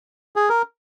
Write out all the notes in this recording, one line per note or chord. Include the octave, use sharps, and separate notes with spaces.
G#4
A#4